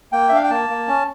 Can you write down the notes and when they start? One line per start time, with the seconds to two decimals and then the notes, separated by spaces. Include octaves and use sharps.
0.12 A#3 G5
0.29 E5
0.31 D4 F5
0.43 G5
0.50 A#3 A5
0.69 A#3
0.88 C#4